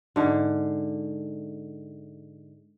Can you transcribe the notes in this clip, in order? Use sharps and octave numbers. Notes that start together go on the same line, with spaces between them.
G#2 D3